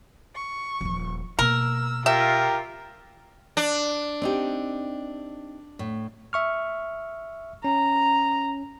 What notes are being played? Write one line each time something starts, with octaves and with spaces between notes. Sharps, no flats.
C#6
D#1 F3
B2 A#3 A#4 E6
F4 G4 A#4 E5
D4
C4 D#4 G4
A2
E5 C#6 F6
C#4 A#5